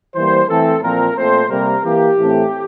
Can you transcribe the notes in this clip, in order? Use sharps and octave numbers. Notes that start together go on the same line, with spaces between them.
E3 G3 A#3 C5
E3 A3 C4 A4
A#2 F3 C4 A#4
A#2 A3 C4 C5
C3 G3 A#3 A#4
E3 A#3 G4
A2 E3 A3 C4